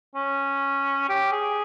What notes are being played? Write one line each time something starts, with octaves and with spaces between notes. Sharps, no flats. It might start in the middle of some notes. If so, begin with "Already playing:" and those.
C#4
G4
G#4